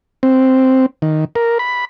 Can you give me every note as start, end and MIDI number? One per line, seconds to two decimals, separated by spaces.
0.23 0.86 60
1.02 1.25 51
1.35 1.58 70
1.59 1.85 83